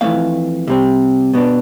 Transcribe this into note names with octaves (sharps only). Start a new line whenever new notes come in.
F2 E3 A3 C4 F5
C3 G3 C4
B2 B3 D4